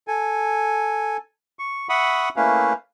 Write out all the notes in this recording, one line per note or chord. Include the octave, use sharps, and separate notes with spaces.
A4 G#5
C#6
E5 F#5 B5 C#6 D#6
A3 A#3 C#4 E4 B4 F5